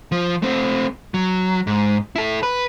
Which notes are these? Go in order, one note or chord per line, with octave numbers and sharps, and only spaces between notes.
F3
A3 C4
F#3
G#2
E4 A4
B4